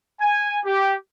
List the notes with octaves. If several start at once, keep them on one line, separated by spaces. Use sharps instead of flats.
G#5
G4